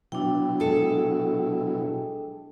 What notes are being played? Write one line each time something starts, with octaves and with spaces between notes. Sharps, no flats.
B2 F#3 D4 E4 G5
G#3 A4